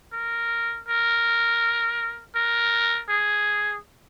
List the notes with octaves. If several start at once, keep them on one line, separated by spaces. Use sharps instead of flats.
A#4
A#4
A#4
G#4